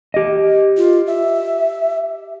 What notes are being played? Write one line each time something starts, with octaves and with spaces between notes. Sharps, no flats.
G4 D#5
F4
E5